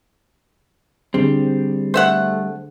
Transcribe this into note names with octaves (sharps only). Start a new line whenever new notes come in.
D3 G3 C4 D4 G#4
A3 C5 E5 F#5